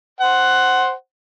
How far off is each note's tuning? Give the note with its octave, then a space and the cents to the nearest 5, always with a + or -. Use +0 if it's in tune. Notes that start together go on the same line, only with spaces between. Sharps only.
C5 +0 F#5 +10